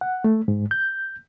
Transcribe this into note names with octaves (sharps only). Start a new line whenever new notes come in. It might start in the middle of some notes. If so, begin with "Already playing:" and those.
F#5
A3
G#2
G6